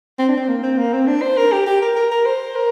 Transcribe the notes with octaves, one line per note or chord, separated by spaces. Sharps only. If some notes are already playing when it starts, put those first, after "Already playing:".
C4
D4
C4
A#3
C4
A#3
C4
D4
C5
A#4
G4
G4
A#4
A#4
A#4
C5
A#4